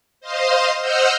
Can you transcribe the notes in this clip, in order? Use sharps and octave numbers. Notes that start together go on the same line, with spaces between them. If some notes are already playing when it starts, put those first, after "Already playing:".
C5 D#5 F5 C6
C5 D#5 F#5 E6 F6 G6